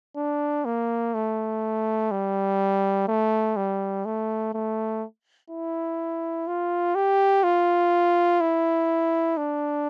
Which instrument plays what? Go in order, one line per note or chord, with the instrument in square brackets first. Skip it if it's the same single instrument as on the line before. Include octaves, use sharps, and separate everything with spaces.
[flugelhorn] D4
A#3
A3
G3
A3
G3
A3
A3
E4
F4
G4
F4
E4
D4